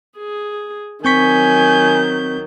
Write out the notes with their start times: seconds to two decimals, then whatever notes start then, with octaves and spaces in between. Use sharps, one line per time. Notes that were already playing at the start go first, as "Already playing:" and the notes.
0.17 G#4
1.05 D#3 F#3 C4 G#5 C#6 G6 B6